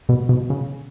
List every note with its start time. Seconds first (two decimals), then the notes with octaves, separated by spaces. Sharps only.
0.09 B2
0.29 B2
0.50 C#3